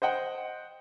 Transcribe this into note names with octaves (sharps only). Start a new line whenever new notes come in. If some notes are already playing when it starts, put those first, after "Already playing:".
C5 D#5 F#5 G5